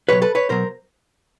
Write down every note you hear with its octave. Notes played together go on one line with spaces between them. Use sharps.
C#2 B2 F#3 B4 C#5
A4 B4
B4 C#5
B2 F#3 A#4 C5